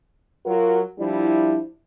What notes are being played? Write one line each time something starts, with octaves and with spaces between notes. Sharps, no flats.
F#3 F4 F#4 A#4
F3 G3 D4 E4